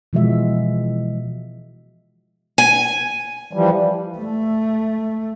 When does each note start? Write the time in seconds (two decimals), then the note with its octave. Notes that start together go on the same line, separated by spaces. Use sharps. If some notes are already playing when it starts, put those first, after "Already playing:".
0.13 B2 E3 F3 G#3 F#4 E5
2.58 G#5
3.53 E3 F3 G3
4.18 A3